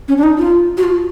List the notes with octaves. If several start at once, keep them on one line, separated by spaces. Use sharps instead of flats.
C#4
D4
D#4
F4
F#4
F4